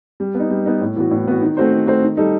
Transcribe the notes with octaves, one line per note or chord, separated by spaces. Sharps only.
G3
B3
D#4
G3
B3 D#4
A2
E3 B3 F#4
A2
E3 B3 F#4
D#3
A3 C4 F#4 C5
D#3
A3 C4 F#4 C5
D#3
G3 D#4 A4